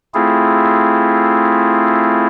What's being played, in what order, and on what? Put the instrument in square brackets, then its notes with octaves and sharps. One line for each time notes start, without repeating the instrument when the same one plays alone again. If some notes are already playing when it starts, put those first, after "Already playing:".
[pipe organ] A3 C4 E4 F4 G#4